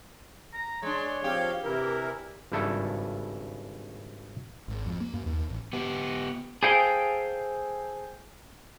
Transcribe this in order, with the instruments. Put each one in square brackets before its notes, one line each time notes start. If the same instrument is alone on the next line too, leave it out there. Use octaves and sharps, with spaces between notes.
[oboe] A#5
[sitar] G#3 D4 [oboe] C#5
[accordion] F3 C4 F5 [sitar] G4
[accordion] C3 E3 A#4 [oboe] E4
[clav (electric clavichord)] G#1 G2 C#3 E4 A4
[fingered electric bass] G#1
F2
A#3
F#2
D#2
A1
[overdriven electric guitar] B3 G4
[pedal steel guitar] G#4 A4 C5 F5 G5